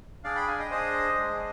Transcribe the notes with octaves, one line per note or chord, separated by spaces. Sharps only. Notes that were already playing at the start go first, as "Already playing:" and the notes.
D4 G#4 D5 F5
G5 B5
F5 G#5
D#5 G5
D4 G#4 C5 D#5
G#3 D4 G#4